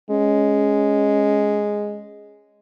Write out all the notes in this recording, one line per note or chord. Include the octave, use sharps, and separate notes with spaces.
G#3 C#4